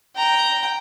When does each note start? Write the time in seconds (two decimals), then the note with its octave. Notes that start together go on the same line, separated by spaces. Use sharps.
0.16 G5 A#5